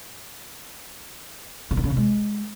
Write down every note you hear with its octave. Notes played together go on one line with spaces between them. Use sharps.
C#3
D3
C#3
C3
G#3